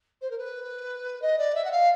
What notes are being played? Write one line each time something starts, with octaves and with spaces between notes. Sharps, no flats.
C5
A#4
B4
D#5
D5
E5
F#5
F5